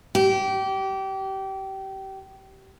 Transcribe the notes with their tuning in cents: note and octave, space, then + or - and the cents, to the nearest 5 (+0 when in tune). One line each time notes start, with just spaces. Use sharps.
G4 -25